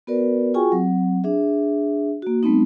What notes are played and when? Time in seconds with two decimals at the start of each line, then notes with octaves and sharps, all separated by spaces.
0.07 B3 F#4 A#4 B4 D5
0.54 F4 F#4 G#4 G5 G#5 C#6
0.72 F#3 C4 F#5
1.24 D4 G#4 E5
2.22 A#3 F#4
2.43 G3 A3 B3 C4 D#4